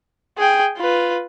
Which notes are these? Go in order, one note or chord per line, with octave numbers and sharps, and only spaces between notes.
G#4 G5
F4 B4